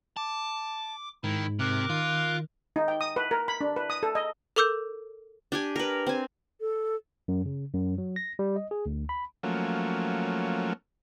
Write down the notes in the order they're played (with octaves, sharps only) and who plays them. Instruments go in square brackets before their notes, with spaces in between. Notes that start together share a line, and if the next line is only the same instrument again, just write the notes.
[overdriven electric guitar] A5 [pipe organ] D6
[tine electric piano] G#2 [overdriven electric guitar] D#3 [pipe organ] E4
[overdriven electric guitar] C3 [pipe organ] A#4 D6 F#6
[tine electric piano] D#3 [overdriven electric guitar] F4
[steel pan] D#4
G5
D#6
B4
A#4
B5
D4
B4
D#6
A4
D#5
[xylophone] A4 A#4 D6 E6 G6
[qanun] D4 G4 G#5
A#4 B4
C4 G#5
[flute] A4
[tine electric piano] F#2
C#3
F#2
F#3
A#6
G3
D#5
G#4
D2
B5
[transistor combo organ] F3 F#3 A3 A#3 C#4